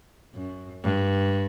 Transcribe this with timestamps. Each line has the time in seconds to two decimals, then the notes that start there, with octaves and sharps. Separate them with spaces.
0.34 F#2
0.83 G2